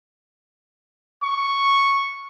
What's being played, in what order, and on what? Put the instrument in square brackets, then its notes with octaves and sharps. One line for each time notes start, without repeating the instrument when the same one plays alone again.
[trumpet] C#6